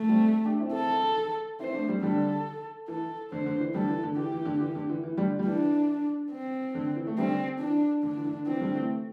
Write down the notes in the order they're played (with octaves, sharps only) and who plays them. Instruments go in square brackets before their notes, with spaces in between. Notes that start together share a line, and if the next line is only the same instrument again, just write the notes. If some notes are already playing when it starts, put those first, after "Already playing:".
Already playing: [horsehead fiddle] A3
[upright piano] G3 C4
D4 G4
C4 E4
[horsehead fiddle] A4
[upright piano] C4 E4 [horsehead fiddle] C5
[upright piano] A3 D4
G3 C4
[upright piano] D3 G3 [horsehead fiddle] A4
[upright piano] E3 [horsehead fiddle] A4
[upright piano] D3 [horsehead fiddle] C5
[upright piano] D3
E3
[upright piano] D3 G3 [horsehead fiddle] A4
[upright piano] E3
D3
[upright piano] E3 [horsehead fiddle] G4
[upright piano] E3
D3
E3
D3
E3
E3
D3 G3
G3
[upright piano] E3 [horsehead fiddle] D4
[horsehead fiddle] C4
[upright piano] D3
E3
A3
[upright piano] D3 G3 [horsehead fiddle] C4
[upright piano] E3 [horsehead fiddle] D4
[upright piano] D3 [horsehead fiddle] D4
[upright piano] E3
D3
[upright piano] E3 [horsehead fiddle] C4
[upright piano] D3 G3
E3 A3